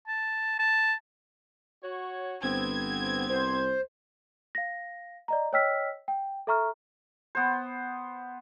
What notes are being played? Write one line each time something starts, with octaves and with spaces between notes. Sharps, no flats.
A5
A5
F#4 C#5
G1 B3 C4 G#6
C2 C5
F5 A#6
D5 D#5 A#5
C#5 D#5 G5 E6 F6 B6
G5
A4 E5 A#5 C#6 F6
B3 C5